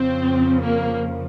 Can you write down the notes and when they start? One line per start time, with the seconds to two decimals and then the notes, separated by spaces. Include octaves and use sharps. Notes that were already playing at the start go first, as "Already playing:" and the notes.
Already playing: F2 C#3 F3 C4
0.61 A#3